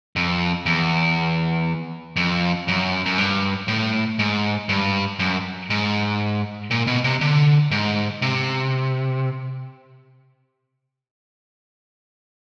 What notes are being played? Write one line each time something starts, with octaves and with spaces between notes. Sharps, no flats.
F2
E2
F2
F#2
F#2
G2
A2
G#2
G2
F#2
G#2
A#2
B2
C3
D3
G#2
C3